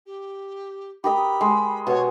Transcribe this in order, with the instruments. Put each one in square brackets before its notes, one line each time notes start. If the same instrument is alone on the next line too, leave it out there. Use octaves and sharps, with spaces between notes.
[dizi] G4
[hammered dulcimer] G4 A#4 D#5 [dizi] B5
[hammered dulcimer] G#3
[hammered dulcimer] B2 F#5 [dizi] C#5